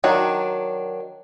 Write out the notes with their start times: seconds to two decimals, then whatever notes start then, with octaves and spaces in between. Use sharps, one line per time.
0.04 D#3 F#3 D4